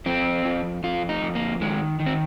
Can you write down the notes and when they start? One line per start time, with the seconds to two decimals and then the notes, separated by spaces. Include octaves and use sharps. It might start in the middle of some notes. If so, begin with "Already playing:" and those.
0.06 F2 C4
0.45 F2
0.83 F2 F4
1.09 D#4
1.22 F2
1.35 A#3
1.61 D#3 G#3
2.00 D#3
2.06 C4